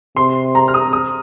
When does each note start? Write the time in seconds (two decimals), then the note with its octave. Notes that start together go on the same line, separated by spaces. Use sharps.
0.16 C3 C6
0.55 A#5
0.68 F6
0.74 D#6
0.93 D#6